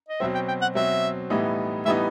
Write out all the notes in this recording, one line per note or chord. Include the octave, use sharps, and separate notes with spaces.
D#5
B2 F#3 C4 E5
G5
G5
F#5
B2 F#3 C4 E5
A2 E3 G3 B3 D#4
A2 E3 G3 B3 D#4 E5